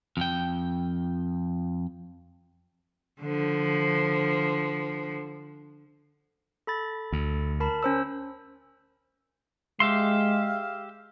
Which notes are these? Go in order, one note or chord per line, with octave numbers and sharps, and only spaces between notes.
F2 G5
D3 F3
A4 B5 A6
D2
A#4 A5 B5
C#4 C5 E6
G#3 G4 E5 F5 C6